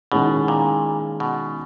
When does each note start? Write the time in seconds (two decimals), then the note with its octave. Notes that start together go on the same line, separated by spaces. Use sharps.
0.12 B2 D#3 G#3 C#4 E4 G#4
0.48 A#2
1.20 B2